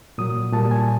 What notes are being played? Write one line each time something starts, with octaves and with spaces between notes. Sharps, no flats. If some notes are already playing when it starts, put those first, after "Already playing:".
A#2 F#3 D#6
A#2 G3 A5
G#5